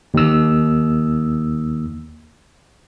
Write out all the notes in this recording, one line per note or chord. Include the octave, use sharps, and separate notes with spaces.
D#2 E6